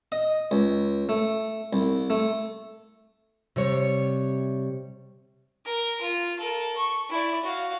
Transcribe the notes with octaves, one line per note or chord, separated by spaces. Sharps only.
D#5
C#2
A3
C2
A3
C3 G3 C#5
A#4
F4
A4 A#4
C#6
E4 D5
F#4 F5